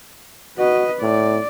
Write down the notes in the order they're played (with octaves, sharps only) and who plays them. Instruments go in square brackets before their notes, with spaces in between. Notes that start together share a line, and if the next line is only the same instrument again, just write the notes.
[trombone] F#4 [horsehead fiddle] B4 D#5
[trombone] A2 [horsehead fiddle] D5